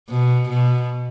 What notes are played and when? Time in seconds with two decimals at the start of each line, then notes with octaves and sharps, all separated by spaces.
0.09 B2
0.48 B2